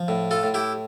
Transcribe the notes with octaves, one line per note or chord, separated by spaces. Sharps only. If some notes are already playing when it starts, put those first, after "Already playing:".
Already playing: F3
A2
F4 A4
A2
E4 G4